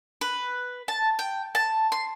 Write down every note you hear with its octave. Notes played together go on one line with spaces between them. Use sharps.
B4
A5
G5
A5
C6